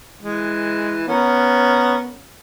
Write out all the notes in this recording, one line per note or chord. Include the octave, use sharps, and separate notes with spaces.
E3 G#3
B3 C#4 A#4